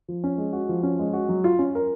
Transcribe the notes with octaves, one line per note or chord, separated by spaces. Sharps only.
F3
C#4
G#3
F#4
F3
C#4
G#3
F#4
F#3
F4
C#4
A#4